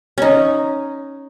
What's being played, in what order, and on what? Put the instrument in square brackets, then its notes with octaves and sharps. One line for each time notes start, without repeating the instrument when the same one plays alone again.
[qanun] C#4 D#4